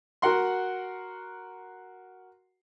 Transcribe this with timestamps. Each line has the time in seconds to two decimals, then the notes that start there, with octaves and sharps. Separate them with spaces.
0.22 F#4 A#4 F#5 C6